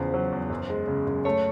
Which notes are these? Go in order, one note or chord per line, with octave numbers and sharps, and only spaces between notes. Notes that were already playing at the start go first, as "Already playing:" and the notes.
Already playing: E2 C#3 F3 C5
F#3
E2
F#2
G#3
C#3
F#2
A3 C#5